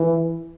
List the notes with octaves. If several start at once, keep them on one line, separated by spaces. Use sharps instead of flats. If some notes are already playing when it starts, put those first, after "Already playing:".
Already playing: E3